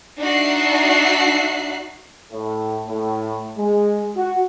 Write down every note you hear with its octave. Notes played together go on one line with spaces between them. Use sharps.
D4 D#4 F#4 E5 F#6 C7
A2
A2
G#3
F#4